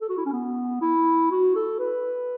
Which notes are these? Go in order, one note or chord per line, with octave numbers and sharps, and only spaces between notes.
A4
F#4
E4
C#4
B3
E4
F#4
A4
B4